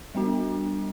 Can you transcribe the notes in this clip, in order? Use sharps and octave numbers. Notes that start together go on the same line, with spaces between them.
G3 B3 D4 F#4